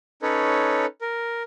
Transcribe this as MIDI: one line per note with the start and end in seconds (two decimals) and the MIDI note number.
0.22 0.86 61
0.22 0.86 63
0.22 0.86 69
0.22 0.86 71
0.22 0.86 73
1.01 1.43 70